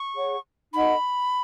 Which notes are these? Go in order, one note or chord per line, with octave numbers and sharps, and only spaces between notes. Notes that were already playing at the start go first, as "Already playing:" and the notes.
Already playing: C#6
G#4 C#5 F#5
D#4 A4 D#5 F#5 B5